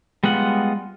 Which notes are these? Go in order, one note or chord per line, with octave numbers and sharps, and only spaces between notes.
G3 G#3 B3 F4 F#5